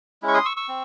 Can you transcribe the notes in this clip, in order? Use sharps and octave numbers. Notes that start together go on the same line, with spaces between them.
G#3 C#4 E4
C#6
C6 D#6
C#6 E6
C#6 E6
C4